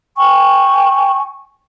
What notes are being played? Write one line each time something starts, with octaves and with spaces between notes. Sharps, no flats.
G5 G#5 C#6